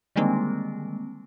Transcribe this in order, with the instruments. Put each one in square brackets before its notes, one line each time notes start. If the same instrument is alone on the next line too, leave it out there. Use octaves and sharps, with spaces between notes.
[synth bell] D3 D#3 G3 G#3 A#3 C4